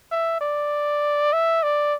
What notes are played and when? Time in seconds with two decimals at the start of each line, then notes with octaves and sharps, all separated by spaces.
0.12 E5
0.41 D5
1.33 E5
1.63 D5